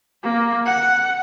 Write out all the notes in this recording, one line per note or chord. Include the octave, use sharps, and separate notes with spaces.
A#3
F#5